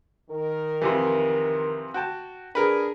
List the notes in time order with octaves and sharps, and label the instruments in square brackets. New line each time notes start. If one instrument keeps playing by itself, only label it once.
[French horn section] D#3 A#4
[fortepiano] F2 C3 E3
F#4 G5 A5
[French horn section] D4 G#4 [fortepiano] A#4 B4